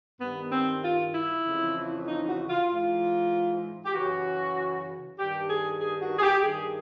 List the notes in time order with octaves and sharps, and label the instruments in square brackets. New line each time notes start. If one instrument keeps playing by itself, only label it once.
[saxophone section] G2 D#3 B3
C4
F4
E4
F2 C#3 E3
D#4
F#4
F4
G#2 E3 F4
G4
F#2 C#3 E3 F#4
G2 D#3 G4
G#4
G#4
F#4
G#4
G4
G2 D#3 G#4